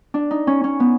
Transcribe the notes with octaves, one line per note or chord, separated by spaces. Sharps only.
D4
D#4
C#4
C#4
B3